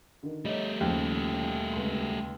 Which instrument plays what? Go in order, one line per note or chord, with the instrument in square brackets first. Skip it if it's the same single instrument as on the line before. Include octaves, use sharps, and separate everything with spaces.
[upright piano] D3 D#3
[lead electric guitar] G3 A3 [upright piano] C#5 D#5
[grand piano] D#2 [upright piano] C#3 F3
[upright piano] C#2 C6